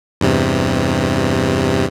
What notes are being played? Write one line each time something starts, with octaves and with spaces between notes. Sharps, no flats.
E2 G2 C3